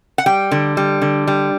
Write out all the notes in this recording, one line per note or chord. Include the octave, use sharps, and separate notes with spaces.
F#5
G3 G5
D3
G3
D3
G3